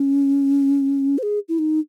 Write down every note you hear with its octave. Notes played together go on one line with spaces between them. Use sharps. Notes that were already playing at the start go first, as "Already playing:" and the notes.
Already playing: C#4
C5
G#4
E4
D#4